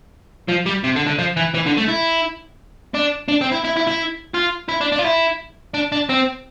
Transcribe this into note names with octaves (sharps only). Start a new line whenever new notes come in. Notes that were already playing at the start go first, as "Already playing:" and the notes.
F3
G3
C3
D3
D3
F3
E3
E3
D3
A3
E4
D4
D4
C4
E4
E4
E4
E4
F4
E4
D4
D4
F4
E4
D4
D4
C4